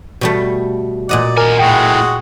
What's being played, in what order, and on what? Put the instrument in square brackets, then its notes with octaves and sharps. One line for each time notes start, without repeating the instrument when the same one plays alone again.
[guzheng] B2 G3 A3
[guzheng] A#2 D#5 F#5 [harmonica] D5
[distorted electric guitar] D#3 G#5 [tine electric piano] A#4
[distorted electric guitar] E2 A2 [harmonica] G#3 F#4 G#4 [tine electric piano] G5